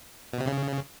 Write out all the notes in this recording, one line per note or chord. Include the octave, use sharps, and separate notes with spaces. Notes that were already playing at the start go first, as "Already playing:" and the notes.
B2
C3
C#3